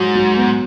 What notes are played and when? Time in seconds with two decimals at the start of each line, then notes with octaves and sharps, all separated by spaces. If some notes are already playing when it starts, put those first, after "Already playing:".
Already playing: G#2 F#3
0.15 F#3
0.37 B3